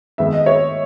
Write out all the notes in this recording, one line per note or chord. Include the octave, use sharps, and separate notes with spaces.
D#3 G#3 B3 E5
D#5
C#5 E5